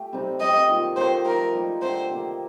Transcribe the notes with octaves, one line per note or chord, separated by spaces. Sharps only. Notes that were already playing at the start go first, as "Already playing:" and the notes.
Already playing: A3 G4
C3 G3 C4 D#4
G3 C4 G4 D#5
D#3 A#3 F4
D#3 A#3 D#4 A4 C5
F3 A3 D#4 A#4
G3 A#3 D#4
D3 A3 C4 G4 C5
C3 D#3 A#3